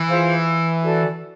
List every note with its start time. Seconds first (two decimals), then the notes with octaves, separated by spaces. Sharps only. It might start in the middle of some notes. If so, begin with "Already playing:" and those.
Already playing: E3
0.09 F4 G#4 C5 F5
0.81 F#4 A4 D5